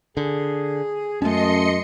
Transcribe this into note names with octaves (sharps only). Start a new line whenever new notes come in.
D3 G#4
F#2 G#3 A3 C#4 D#5 A5 C6 C#7